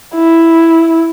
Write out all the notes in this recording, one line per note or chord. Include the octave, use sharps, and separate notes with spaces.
E4